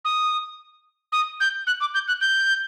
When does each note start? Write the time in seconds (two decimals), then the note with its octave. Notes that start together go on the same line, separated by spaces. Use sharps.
0.05 D#6
1.12 D#6
1.40 G6
1.67 F#6
1.81 D6
1.94 G6
2.08 F#6
2.21 G6